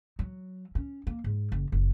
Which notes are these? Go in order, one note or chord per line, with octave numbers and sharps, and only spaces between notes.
F#3
C#4
A#3
G#2
F#1
F#1